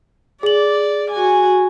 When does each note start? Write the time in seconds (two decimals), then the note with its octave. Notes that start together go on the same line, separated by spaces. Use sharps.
0.43 G#4 D5 F#7
1.10 F#4 G#5